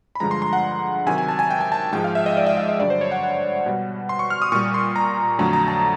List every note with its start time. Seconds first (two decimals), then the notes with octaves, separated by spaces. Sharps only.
0.15 B5
0.20 G2 D3 F3 G#3 A#5
0.31 C6
0.42 C6
0.53 F#5
1.06 C3 D#3 F#3 G#5
1.18 G#5
1.28 A5
1.39 G#5
1.50 G5
1.61 G#5
1.72 A5
1.92 G#2 F3 G#3 G5
2.04 F5
2.15 E5
2.26 D#5
2.37 D5
2.47 E5
2.57 F5
2.69 D#5
2.80 G2 D3 F#3 D5
2.90 C5
3.01 C#5
3.12 F#5
3.23 F#5
3.66 B2 G3
4.09 C6
4.19 C#6
4.30 F6
4.42 D#6
4.52 A#2 G3 C#6
4.74 C6
4.96 A#5
5.39 F2 D3 F#3 A3 A#5
5.53 A#5
5.68 A5